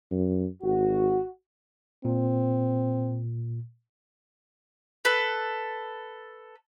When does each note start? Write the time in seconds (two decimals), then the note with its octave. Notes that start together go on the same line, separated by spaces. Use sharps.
0.11 F#2
0.62 G#1 F#4
2.05 A#2 C4
5.05 A4 B4